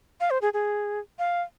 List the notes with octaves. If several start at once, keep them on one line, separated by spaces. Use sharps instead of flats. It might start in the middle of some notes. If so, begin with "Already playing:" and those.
F5
C5
G#4
G#4
F5